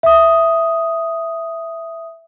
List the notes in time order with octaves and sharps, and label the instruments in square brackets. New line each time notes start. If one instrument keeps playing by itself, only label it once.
[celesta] E5 D#6